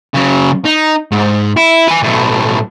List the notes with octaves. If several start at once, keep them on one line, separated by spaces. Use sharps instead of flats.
C#3 F#3
D#4
G#2
E4
B4 G#5
B1 A2